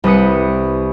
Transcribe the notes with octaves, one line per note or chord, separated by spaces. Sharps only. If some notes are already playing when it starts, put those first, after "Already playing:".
C2 B4 D#6 C#7